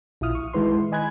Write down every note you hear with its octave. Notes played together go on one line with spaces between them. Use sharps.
A#1 E4 F4 D#6 F6
C#6
D#3 G#3 E4 B4 C6
D#5 G#5 B5 F#6 G#6